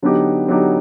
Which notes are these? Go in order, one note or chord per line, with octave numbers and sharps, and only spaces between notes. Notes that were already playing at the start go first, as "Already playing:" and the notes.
D3 F#3 B3 D#4 G4
D3 F#3 B3 D#4 G4